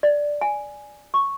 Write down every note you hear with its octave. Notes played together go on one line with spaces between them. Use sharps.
D5
G#5
C#6